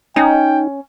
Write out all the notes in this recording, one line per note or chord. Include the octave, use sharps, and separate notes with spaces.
C#4 D#4 G5